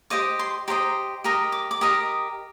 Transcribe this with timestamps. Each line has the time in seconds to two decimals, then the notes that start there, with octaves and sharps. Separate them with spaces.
0.10 G4 C5 D#5 D6
0.39 C6
0.68 G4 C5 D#5 A#5
1.24 G4 A#4 D#5 A#5
1.52 D6
1.71 D6
1.81 G4 A#4 D#5 D#6